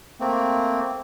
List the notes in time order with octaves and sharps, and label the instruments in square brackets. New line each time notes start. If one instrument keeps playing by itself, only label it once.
[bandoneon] A3 A#3 C4